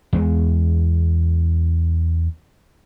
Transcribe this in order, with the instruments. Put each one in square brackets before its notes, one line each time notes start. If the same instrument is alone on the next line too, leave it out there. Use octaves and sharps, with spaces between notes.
[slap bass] E2 G#3